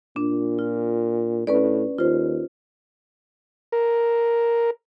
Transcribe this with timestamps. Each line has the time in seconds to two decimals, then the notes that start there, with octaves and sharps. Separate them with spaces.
0.16 A#2 D4
0.59 F4
1.47 A2 C#4 B4 D5
1.98 D#2 F4 C5
3.72 A#4